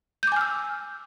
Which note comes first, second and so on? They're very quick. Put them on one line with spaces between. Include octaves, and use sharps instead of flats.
G6 D6 G#5 F6 E6